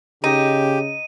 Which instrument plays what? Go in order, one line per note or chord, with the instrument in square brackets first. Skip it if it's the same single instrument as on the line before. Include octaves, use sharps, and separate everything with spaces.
[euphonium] C#3 [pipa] D#4 [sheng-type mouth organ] G4 [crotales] D#7